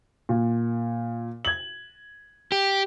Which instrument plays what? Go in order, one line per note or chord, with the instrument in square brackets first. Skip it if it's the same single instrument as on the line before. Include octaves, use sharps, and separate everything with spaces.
[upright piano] A#2
G#6 F#7
[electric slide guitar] G4